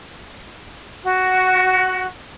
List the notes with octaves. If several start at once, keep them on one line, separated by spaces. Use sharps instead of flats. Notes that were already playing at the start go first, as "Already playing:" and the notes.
F#4